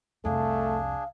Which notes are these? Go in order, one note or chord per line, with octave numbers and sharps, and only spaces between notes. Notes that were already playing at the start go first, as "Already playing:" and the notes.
C2 F2 A3 D4 G#4 F5